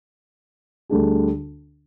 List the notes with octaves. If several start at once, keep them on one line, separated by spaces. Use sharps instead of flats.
D2 D3 G3 D4 G#4